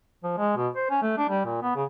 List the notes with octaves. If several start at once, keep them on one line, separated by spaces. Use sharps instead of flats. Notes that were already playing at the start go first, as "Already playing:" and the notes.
F3
G#3
B2
C5
C#4
A3
D4
G3
A#2
B3
C#3